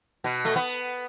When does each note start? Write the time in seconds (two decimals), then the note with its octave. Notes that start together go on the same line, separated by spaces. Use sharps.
0.24 B2
0.45 A3
0.56 B3